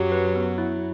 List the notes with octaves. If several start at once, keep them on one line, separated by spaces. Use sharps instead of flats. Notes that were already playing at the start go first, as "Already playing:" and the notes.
Already playing: F#2 F#3 G4
B4
B3
E4